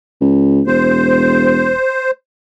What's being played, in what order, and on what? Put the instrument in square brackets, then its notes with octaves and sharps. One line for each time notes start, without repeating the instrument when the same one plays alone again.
[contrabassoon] C#2
[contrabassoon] E1 [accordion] C5